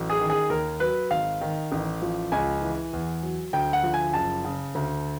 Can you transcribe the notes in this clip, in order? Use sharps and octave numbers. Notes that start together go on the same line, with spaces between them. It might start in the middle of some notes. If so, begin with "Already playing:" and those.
Already playing: A1 F#3
G#4
D#3
G#4
D#2 A#4
F#3 B4
G#1 F5
D#3
A1
F3
C#2 G#5
E3
E2
F#3
D2 G5
F#5
F3
G#5
F#1 A5
C#3
D2